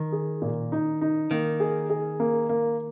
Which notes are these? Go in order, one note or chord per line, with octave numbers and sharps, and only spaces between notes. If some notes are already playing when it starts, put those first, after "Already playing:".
Already playing: D#3
G#4
A#2
D#4
D#4
D#3 A#3
G#4
G#4
A#3
A#3